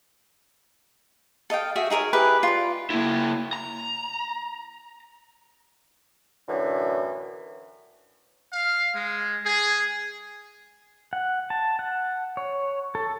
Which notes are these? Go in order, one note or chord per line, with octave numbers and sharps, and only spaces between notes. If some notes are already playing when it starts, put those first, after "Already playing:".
A4 D#5 F5 G5
F#4 G#4 E5
D#4 G#4 A#4 C#5
E4 G4 G#4 B4
F4 D5
A#3 E4
A#5
F#2 A2 D3 E3
F5
G#3
G#4
F#5
A5
F#5
C#5
A4